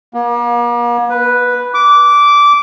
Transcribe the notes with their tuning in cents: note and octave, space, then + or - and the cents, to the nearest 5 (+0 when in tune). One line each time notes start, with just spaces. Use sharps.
A#3 +40
B4 -5
D6 -15